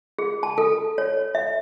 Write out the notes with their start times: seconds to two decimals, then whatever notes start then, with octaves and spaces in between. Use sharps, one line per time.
0.19 G#4
0.43 A5
0.58 A4
0.98 C#5
1.35 E5